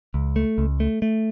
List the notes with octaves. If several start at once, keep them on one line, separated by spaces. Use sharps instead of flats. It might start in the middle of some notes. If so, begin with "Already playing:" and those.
C#2
A3
C#2
A3
A3